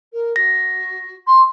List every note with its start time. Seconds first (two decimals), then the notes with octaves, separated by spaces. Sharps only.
0.12 A#4
0.36 F#4 A#6
1.26 C6